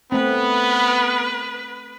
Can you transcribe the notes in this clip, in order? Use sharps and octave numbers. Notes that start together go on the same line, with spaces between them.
A3 B3 C4 B4